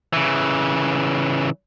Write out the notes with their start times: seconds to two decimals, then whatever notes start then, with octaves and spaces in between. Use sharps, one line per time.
0.13 C#3 E3